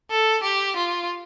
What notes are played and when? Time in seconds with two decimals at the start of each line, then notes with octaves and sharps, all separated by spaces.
0.11 A4
0.43 G4
0.76 F4